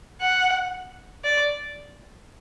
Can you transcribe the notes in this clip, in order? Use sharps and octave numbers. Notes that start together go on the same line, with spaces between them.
F#5
D5